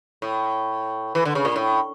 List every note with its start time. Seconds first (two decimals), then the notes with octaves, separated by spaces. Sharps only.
0.22 A2
1.15 E3
1.25 D3
1.35 C#3
1.45 A#2
1.56 A2